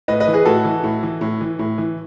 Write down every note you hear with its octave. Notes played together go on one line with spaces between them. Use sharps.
A2 B4 D#5
B4 D#5
E3
G#4 B4
A2 F#4 A4
E3
A2
E3
A2
E3
A2
E3